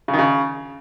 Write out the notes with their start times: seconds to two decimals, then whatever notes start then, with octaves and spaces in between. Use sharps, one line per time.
0.08 C#3
0.13 D#3
0.19 C#3